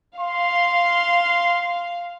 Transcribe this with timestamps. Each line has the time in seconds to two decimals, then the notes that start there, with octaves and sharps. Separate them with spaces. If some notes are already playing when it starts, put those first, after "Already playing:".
0.19 F5 C6